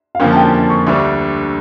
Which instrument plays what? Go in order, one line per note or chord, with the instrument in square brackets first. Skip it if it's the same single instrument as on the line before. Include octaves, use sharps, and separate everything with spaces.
[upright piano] F5
[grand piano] F2 D3 F3 A#3 C#4 [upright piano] G5
[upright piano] A5
G5
A5
C#6
[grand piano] D2 D3 G3 D4 [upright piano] C#6